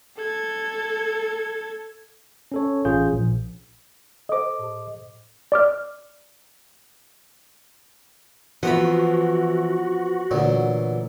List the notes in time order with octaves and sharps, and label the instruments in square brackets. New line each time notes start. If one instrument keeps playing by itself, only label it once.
[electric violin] A4 G#6
[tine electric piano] C#4 A4 C#5
A1 C#4 F4 G#4 G6
A#1
[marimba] A4 C5 [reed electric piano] D#5 D6
[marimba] A2
[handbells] D5 D6 F6
[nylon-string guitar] E3 [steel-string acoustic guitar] F3 B3 C4 [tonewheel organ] F#4 [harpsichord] F#5 A#5 B5
[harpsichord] D2 F#3 [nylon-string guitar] A#2 E3